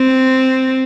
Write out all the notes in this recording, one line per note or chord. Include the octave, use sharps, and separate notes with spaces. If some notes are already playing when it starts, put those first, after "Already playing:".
Already playing: C4